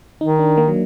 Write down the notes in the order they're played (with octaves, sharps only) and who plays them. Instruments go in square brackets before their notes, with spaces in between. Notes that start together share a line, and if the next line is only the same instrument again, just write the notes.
[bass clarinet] D#3 [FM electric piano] D#4
[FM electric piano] D4
A#3
F#3